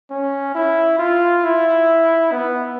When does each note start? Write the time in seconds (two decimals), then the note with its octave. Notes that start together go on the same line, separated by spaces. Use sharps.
0.11 C#4
0.55 E4
0.99 F4
1.44 E4
2.32 B3